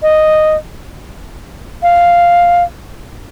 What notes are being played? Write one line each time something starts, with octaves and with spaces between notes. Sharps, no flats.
D#5
F5